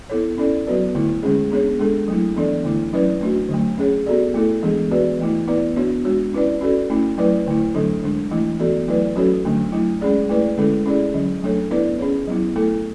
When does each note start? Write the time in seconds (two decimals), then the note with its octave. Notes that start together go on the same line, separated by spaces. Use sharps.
0.09 B3 E4 A4 C#5
0.38 C#4 E4 A4 D5
0.67 F#3 B3 F#4 B4 D5
0.95 D3 A3 E4
1.23 D3 G#3 C#4 G#4
1.51 B3 D4 G#4 C#5
1.79 G#3 D4 A4
2.08 F#3 A3 E4
2.36 E3 B3 D4 A4 D5
2.64 D3 A3 E4
2.93 F#3 C#4 E4 B4 D5
3.21 A3 D4 F#4
3.49 D3 F#3 A3
3.78 C#4 G#4 C#5
4.06 B3 F#4 A4 D5
4.34 A3 E4 A4
4.63 E3 G#3 B3 D4 G#4
4.91 B3 F#4 B4 D5
5.19 E3 A3 E4
5.48 B3 E4 B4 D5
5.76 B3 D4 F#4 C#5
6.05 G#3 D4 F#4 C#5
6.33 C#4 E4 B4 D5
6.61 C#4 F#4 A4 D5
6.90 A3 C#4 E4
7.18 F#3 A3 E4 B4 D5
7.46 D3 A3 E4
7.75 D3 F#3 A3 D4 A4
8.03 D3 G#3 D4
8.31 E3 A3 E4
8.59 E3 B3 F#4 A4 D5
8.88 F#3 A3 E4 B4 D5
9.16 F#3 C#4 F#4 A4 C#5
9.45 D3 F#3 A3 D4
9.72 F#3 A3 E4
10.01 G#3 C#4 G#4 D5
10.29 A3 E4 B4 D5
10.58 D3 G#3 C#4 E4 A4
10.86 C#4 E4 G#4 D5
11.14 D3 F#3 C#4
11.43 F#3 A3 D4 A4 C#5
11.71 B3 E4 B4 D5
11.99 C#4 G#4 C#5
12.27 F#3 B3 E4
12.56 A3 E4 A4